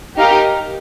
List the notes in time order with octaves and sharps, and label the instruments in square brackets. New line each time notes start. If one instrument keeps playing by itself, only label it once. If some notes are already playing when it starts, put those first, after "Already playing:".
[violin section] D#4 G4 A#4 F5